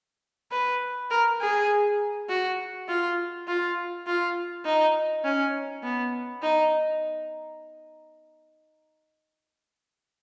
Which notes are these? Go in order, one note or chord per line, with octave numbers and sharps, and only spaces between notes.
B4
A#4
G#4
F#4
F4
F4
F4
D#4
C#4
B3
D#4